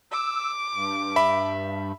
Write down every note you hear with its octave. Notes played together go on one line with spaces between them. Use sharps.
D6 E6
G2
E5 B5